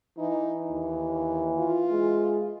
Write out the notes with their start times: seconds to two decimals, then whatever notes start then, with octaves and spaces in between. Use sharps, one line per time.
0.18 E3 D#4
0.70 D#2
1.58 F4
1.92 G#3